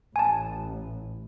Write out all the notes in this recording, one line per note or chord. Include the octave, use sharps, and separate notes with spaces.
A1 G#5 A5